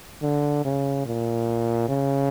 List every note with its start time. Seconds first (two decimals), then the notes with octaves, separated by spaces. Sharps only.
0.22 D3
0.65 C#3
1.06 A#2
1.89 C#3